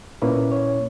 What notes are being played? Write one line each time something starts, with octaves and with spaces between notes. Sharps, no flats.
A#2 A#3 C#4 E4 B4
C#5